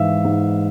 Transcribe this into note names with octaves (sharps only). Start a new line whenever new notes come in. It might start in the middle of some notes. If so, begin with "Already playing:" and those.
Already playing: G#2 E3 E5 F5
G#2